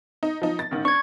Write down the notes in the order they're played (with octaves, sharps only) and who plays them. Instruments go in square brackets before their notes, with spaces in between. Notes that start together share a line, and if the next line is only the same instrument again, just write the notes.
[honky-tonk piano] D#4
F3 D#4
A6
A1 D#3
[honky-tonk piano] D4 [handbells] C#6 G#6